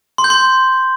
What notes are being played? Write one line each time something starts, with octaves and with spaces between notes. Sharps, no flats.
C6
G6
C6